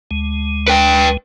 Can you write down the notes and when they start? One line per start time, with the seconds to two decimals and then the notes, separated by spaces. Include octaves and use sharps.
0.11 D2 G#3
0.68 B4 G5